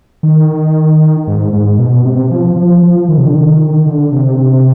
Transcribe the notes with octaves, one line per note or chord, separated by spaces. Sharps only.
D#3
G#2
G#2
B2
C3
F3
F3
F3
D#3
C3
D3
D#3
D3
C3
C3